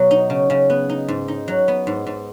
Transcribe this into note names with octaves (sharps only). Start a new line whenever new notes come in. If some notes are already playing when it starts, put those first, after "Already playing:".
Already playing: B2 F#3
D#4
C#3
C#3
B3
D#4
G#2
D#4
F#3
B3
G#2
G#2